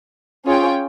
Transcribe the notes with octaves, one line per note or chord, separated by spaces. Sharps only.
C#4 F4 G#4 C#5 G5